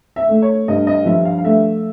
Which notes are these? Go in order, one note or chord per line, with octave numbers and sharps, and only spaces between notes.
E5
A3
C#5
G2 D#5
D#5
F3 E5
F5
F5
A3 E5